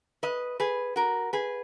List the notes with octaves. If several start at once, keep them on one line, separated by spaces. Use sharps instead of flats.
B4 D#5
G#4 B4
F#4 A#4
G#4 B4